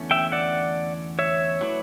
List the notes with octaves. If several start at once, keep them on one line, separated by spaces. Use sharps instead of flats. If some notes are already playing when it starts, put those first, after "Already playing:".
Already playing: E2 D3 A3 C#4
E5 G5
D5 F#5
C#5 E5
F#3 A3 E4 B4 D5